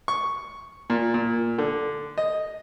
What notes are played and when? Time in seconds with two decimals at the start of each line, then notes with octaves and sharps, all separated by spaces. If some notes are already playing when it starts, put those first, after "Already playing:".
0.08 C#6
0.90 A#2
1.14 A#2
1.58 D3
2.18 D#5